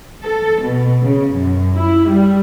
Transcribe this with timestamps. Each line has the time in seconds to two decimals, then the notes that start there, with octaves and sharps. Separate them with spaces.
0.22 A4
0.63 B2
1.01 C#3
1.33 F#2
1.77 E4
2.11 G3